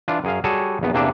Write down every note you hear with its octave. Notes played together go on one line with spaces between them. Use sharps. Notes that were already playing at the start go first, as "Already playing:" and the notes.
E3 D4 F4
F#2 G#4 F5
G3 F#4 G#4 A4 C#5 A5
A#1 E2 B3
E2 C3 A#3 D4 E5